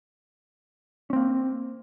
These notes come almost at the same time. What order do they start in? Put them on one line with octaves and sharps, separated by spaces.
C#4 C4 A#3